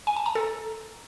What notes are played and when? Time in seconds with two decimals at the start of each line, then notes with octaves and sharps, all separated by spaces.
0.07 G#5
0.16 A5
0.26 A#5
0.35 A4